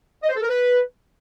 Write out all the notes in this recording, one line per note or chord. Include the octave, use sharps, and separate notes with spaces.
D#5
C5
A4
A#4
B4